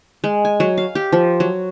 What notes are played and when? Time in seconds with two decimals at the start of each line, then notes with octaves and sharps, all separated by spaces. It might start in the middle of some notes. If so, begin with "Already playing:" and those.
0.24 G#3
0.45 G#5
0.60 F#3
0.78 F5
0.95 G4
1.12 F3
1.40 F#3